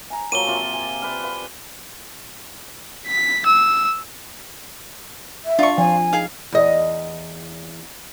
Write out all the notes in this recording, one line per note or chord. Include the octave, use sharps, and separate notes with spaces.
G#5 A#5
F3 F#3 A#3 D#7 G7
C3 F4 G4
G#5
B4 D5 F5
B4 F5
B6
E6
E5
D4 F4 C#6
F3 G#5
D#4 G#4 F5
E2 D#5